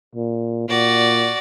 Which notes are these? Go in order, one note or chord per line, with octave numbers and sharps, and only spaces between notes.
A#2
A#2 F#4 D5